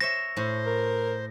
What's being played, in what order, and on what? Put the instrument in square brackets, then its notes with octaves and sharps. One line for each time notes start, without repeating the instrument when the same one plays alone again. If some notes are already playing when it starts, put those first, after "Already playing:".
[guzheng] C5 C#5 E5 [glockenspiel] A#6
[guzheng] A2 [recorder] C5
[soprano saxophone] A#4